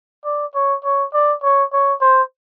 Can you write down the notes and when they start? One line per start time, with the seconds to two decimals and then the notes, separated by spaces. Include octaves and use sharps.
0.25 D5
0.54 C#5
0.84 C#5
1.13 D5
1.43 C#5
1.73 C#5
2.01 C5